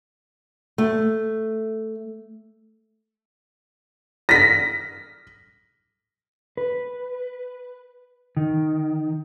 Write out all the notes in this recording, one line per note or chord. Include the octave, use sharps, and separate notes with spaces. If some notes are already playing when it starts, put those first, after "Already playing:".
A3
A#6 B6
B4
D#3